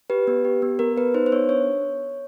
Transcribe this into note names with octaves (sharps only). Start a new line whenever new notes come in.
G4 B4
B3
G4
B3
B3 A#4
B3 B4
D#4 C5
C5
B3 C#5
D4 C#5